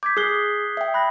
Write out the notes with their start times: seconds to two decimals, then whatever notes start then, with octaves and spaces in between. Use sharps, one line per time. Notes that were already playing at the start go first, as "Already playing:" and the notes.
0.03 D6 G6 G#6 B6
0.17 G#4 D#6 F#6 C7 G7
0.77 E5 G5
0.94 B5 F#6 A#6